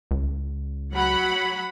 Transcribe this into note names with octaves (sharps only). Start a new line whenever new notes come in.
C#2
F#3 F#5 B5